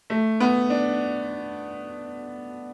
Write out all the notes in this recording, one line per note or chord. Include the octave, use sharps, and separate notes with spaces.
A3
B3
D4